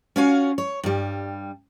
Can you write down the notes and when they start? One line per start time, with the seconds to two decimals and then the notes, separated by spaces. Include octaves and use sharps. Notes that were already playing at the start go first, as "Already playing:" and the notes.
0.16 C#4 F4 F#4 C#5 F5 G#5
0.58 C#5
0.84 G2 G3